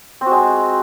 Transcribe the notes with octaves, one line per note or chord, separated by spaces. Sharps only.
C4
F#4
G#3